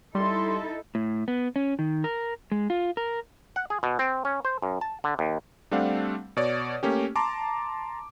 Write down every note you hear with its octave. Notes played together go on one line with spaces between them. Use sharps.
G3 D#4 E4 A4 C6
A2
B3
C#4
D#3
A#4
G#3
F4
A#4
F#5
G#4
B2
C4
C#4
C5
F#2
A5
D3
D#2
G3 A3 C4 D4 F5 F#5
B2 C#5 D5
A3 A#3 C#4 G4
A5 A#5 C6 D6